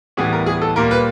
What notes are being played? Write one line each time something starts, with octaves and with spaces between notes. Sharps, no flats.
A2 E3 G3 B3 G#4
A#4
G#4
A4
A#2 G3 A#3 A#4
B4